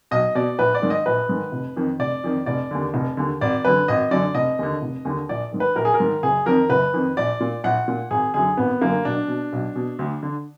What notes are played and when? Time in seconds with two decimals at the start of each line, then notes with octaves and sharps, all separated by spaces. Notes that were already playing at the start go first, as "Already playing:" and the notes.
0.11 B1 D#5
0.35 B2 D5
0.59 A#1 B4
0.75 D5
0.82 G#2 D#3
0.90 D#5
1.06 A#1 B4
1.29 G#2 D#3
1.52 F1
1.77 F2 D#3
1.99 F1 D5
2.24 F2 D#3
2.46 F1 D5
2.71 D#2 D3
2.94 F1
3.17 D#2 D3
3.41 G#1 D5
3.64 F#2 D3 B4
3.88 G#1 D#5
4.11 F#2 D3 D5
4.35 F1 D#5
4.59 D#2 D3
4.82 F1
5.05 D#2 D3
5.29 A#1 D5
5.52 G#2 D#3
5.60 B4
5.76 A#1 A#4
5.85 G#4
5.94 A#4
6.00 G#2 D#3
6.23 F#1 G#4
6.46 F2 D#3 A#4
6.70 F#1 B4
6.94 F2 D#3
7.17 A#1 D5
7.40 A#2
7.64 A#1 F#5
7.88 A#2
8.10 G#1 G#4
8.34 F#2 D3 G#4
8.57 G#1 B3
8.81 F#2 D3 A#3
9.05 B1 D4
9.28 B2
9.53 B1
9.75 B2
9.99 D2
10.23 D3